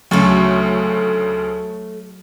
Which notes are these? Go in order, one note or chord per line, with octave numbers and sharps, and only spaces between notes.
D2 C#3 F#3 A3 A4 C#5